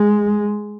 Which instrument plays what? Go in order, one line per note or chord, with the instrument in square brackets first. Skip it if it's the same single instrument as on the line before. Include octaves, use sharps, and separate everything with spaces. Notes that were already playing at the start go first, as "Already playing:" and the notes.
Already playing: [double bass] G#3